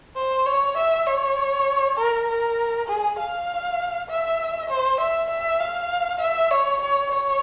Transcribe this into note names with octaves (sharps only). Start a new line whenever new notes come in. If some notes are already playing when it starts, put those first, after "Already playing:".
C5
C#5
E5
C#5
A#4
A#4
G#4
F5
E5
C5
E5
E5
F5
E5
C#5
C#5
C#5